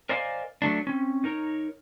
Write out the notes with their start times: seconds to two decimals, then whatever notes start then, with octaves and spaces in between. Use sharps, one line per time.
0.09 A#4 C5 D5 D#5 F5 G#5
0.62 F#3 A3 D4
0.87 C4 C#4
1.24 D#4 A#4 C#5